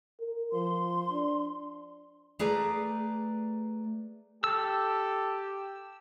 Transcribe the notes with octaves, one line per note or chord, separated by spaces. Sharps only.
A#4
F3 C6
D4
A3 G#4 B4 D5 A#5
G4 A4 E6